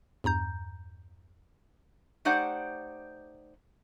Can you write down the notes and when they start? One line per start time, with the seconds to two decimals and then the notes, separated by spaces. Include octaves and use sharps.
0.24 E2 G2 A#5 G6
2.25 A3 D#4 G4 C5 D5 F#5